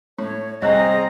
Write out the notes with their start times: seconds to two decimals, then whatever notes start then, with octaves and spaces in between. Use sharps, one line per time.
0.18 A2 C#5
0.62 C2 C4 G#4 C#5 D#5 A#5 F#6